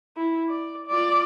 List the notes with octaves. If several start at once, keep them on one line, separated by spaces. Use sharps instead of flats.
E4
D5
F4 D5